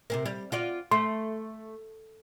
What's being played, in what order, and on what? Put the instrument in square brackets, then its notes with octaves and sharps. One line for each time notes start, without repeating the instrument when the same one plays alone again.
[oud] C3 C4 A#4
G3
F4 F#4 D5
[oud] A3 [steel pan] C6